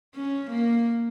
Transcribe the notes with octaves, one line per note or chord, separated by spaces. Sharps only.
C#4
A#3